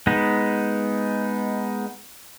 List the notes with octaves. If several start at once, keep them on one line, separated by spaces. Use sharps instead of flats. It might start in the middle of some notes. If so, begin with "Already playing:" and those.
G#3 B3 D#4